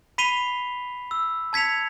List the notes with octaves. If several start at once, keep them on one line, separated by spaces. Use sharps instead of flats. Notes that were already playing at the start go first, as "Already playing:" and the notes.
B5 B6 C7 D#7 F7 G7
E6
A5 G#6 B6 C#7 F7